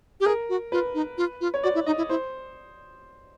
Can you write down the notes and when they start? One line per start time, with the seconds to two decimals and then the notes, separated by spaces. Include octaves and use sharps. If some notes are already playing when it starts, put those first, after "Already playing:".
0.20 G4
0.26 G#4 A#4
0.49 F#4
0.72 F4 B4
0.94 D#4
1.18 F4
1.41 F4
1.54 C#5
1.63 F#4 D5
1.75 E4
1.86 D#4 D#5
1.98 E4
2.09 E4 C5